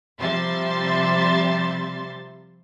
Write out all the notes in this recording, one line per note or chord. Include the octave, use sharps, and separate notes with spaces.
C3 F3 G3 E5 C6 A6